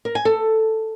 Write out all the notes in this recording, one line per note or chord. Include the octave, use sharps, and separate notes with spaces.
A#4
G#5
A4